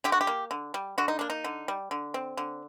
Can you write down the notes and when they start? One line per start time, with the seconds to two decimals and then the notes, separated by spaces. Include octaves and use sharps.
0.04 D3 G4
0.12 F#4
0.21 G4
0.27 A#3
0.51 D3
0.74 G3
0.98 D3 F#4
1.08 D#4
1.19 A#3 D4
1.30 D#4
1.44 D3
1.68 G3
1.91 D3
2.14 C4
2.37 D3